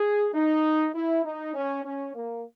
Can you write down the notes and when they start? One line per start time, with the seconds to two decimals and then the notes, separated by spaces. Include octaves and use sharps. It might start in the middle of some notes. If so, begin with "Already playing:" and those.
Already playing: G#4
0.34 D#4
0.94 E4
1.24 D#4
1.54 C#4
1.84 C#4
2.15 A#3